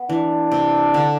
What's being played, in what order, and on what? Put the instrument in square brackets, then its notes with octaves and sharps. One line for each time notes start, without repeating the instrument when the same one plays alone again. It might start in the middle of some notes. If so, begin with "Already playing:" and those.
Already playing: [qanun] B3
[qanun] E3 [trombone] D4
[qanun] C3
D3